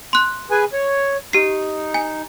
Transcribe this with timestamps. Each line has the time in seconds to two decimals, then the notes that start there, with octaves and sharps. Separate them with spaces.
0.13 C6 F#6
0.51 G#4 B4 G#5
0.73 C#5
1.33 D#4 G4 C7
1.94 G#5